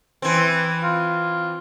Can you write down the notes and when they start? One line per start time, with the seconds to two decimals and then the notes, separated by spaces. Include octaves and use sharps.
0.22 E3 C4
0.83 F4